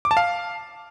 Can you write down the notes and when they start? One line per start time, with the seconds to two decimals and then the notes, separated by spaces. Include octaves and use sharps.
0.05 D6
0.11 A5
0.17 F5